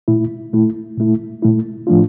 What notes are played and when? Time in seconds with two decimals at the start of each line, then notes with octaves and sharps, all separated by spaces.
0.08 A#2 A3 E4
0.53 A#2 A3 E4
0.98 A#2 A3 E4
1.43 A#2 A3 E4
1.87 A2 F3 A3 D4 F4